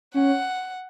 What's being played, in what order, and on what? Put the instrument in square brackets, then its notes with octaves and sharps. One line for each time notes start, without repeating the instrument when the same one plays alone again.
[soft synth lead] C#4 [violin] F#5